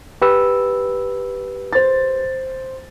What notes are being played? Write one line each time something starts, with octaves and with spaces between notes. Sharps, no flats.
G4 B4 E6
C5 A6